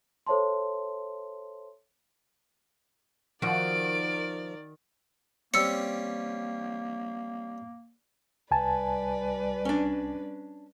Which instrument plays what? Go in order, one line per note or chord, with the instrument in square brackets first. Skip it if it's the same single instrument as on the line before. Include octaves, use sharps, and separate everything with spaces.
[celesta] A4 C5 C#5 E5 A5 C6
[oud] D#3 F#4 [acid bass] F3 [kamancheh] A#4 D5 [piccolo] D7
[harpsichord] G3 C4 C#4 [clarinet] A#3 [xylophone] E6 C#7
[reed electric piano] C2 G#5 A5 [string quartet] G3 B4 D5
[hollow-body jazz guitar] C#4 D4